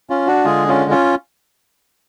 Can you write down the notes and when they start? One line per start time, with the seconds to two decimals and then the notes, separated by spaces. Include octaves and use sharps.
0.10 C#4 F4
0.27 D4 F#4
0.45 D3 G#3 F4 G#4
0.68 C#4 F4
0.91 C#4 F4